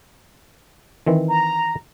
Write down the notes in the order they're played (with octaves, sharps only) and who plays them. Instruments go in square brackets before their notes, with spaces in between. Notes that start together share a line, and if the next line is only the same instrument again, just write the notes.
[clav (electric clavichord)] D#3 E3 C4
[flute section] A#5